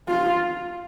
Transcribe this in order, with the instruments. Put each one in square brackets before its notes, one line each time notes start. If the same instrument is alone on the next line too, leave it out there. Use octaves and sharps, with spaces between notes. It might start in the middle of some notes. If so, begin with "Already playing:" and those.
[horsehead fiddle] F4